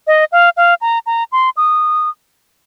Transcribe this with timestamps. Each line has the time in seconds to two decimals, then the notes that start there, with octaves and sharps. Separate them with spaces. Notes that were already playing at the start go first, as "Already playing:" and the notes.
0.07 D#5
0.32 F5
0.57 F5
0.81 A#5
1.06 A#5
1.32 C6
1.57 D#6